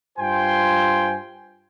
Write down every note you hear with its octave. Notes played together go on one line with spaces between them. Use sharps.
G2 F4 C5 G5 G#5 C6